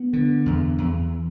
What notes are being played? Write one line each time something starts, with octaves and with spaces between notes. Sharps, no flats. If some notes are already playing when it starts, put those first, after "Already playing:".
Already playing: B3
D3
E2
E2